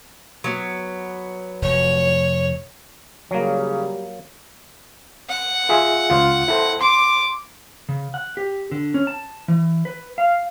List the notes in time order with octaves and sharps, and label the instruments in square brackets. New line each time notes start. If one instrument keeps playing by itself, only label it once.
[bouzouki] F#3 B3
[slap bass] F1 [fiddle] C#5
[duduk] C#3 [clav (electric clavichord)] F#3 A#3 [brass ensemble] G3
[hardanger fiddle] F#5
[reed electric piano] F4 G#4 E5
C#2 F4
E4 A4 C5
[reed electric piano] C6 [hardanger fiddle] D6
[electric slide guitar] C#3
F#5
G4
D3
C#4
A5
E3
B4
F5